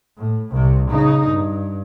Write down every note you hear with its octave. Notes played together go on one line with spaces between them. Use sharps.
A2
C2 C3
C#3 D#4
G2